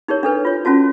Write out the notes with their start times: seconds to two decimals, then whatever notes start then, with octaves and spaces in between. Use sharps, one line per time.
0.08 D#4 G4 A#4 C#5
0.23 D4 A4 B4
0.45 F4 C#5
0.65 C#4 F4 F#4 A5